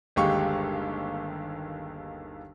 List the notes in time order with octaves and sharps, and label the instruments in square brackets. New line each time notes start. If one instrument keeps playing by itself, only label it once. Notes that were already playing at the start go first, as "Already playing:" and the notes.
[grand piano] G1 D#2 G#3 G4 F5 C#6